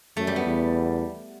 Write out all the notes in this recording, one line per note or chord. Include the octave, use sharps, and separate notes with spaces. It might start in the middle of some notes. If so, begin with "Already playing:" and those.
F#2 A3
G3
B3
E2